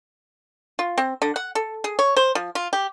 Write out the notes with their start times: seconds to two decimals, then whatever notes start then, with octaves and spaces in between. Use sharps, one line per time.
0.79 F4
0.98 C4
1.22 D3
1.36 F#5
1.55 A4
1.84 G#4
1.99 C#5
2.17 C5
2.35 F3
2.55 F4
2.73 G4